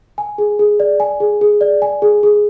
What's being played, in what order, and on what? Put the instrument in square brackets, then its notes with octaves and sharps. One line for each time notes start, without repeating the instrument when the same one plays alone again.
[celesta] G#5
G#4
G#4
D5
G#5
G#4
G#4
D5
G#5
G#4
G#4